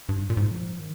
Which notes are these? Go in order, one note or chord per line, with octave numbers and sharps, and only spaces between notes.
G2
A#2
G#2
F3
D#3